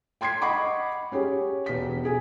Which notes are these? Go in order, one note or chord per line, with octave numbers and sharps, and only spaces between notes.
G5 C6 G#6 B6 C7
D#5 F#5 B5 C#6 D6
C#4 G4 G#4 C#5
E1 B6
G#4 G#5